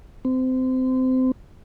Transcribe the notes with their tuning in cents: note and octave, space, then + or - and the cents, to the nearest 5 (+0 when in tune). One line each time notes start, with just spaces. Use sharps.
C4 -25